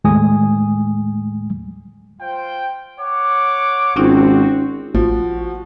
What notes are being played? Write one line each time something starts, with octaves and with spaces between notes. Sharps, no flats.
D#2 A2 G#3 A3 G#5 D#6
F4 C5 G5
C#5 F#5 D6
G#1 C4 C#4 D#4 F4 F#4
A1 F3 F#4